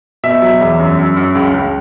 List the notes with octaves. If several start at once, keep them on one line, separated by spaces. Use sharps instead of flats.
B2 E5
F#3
E2
F#2
F#2
F#2
C#2
C#2